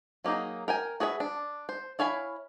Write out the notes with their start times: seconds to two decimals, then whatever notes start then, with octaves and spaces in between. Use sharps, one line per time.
0.24 F#3 A#3 C#4 D#4 G#4
0.68 A#4 G5 G#5
1.00 F#4 G#4 B4 C#5 E5
1.20 D4
1.69 C5
1.99 E4 C#5 F5 G#5 B5